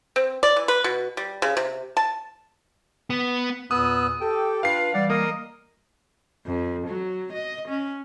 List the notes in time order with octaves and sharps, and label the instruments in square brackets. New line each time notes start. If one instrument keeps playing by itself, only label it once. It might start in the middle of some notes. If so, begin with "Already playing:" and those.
[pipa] C4
D5
E3
B4
B2
G3
C#3
C3
A5
[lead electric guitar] B3
[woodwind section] E2 A#2 [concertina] B3 E6 F#6 [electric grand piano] D#6
[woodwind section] G4 A4 [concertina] G5
[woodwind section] D4 F4 B4 [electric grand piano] F5 C7
[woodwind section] E3 G3 [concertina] D5 F#5
[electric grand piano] A#3 [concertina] A#4 D#5 D#6
[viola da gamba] F2
F#3
D#5
C#4